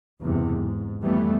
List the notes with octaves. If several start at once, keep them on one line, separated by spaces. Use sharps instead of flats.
F#1 E2 G2 C3
G#2
F2 E3 G3 A3 B3